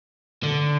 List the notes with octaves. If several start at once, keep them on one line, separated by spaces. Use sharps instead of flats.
D3